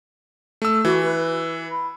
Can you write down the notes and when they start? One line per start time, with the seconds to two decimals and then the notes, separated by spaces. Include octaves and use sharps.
0.62 A3 E6
0.85 E3 F#4
1.05 B4
1.71 B5